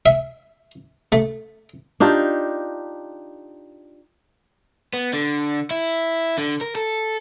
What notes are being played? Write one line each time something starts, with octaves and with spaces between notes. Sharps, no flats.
E5
A3
D4 D#4 F4 G4
B3
D3
E4
D3
A#4
A4